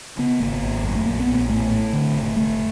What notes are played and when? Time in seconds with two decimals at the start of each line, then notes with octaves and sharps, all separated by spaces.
0.18 C#3 B3
0.40 G#1 A#3
0.62 G#1
0.84 F#2
0.95 A3
1.05 A#1 A#3
1.20 B3
1.27 A#1
1.35 B3
1.49 A2 A3
1.71 A2
1.93 D3
2.14 F1
2.36 F1 A3